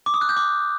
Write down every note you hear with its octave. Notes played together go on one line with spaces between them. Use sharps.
D6
D#6
F#6
G6
D6